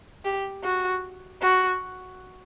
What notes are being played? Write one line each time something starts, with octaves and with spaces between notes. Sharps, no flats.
G4
F#4
F#4